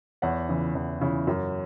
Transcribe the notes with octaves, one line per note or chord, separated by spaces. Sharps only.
E2 C#5 F#5
C#3 E3
E2
C#3 E3
F#2